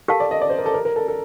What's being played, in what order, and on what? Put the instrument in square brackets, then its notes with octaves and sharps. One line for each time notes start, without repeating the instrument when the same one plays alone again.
[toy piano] G4 A#4 F5 A5 [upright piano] A4
[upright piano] D5
D#5
D5
C5
A#4
A4
A#4
A#4
A4
A4